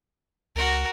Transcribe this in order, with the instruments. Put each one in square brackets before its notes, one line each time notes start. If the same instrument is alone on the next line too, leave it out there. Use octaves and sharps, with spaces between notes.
[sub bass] C#2 [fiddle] F#4 A#4